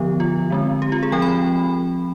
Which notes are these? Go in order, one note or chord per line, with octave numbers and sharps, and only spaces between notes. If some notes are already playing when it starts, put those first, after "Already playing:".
Already playing: D3 F3 B3 G4
F4
D3 G#3 C4
G4
F4
G#4
F3 C4 G5
B5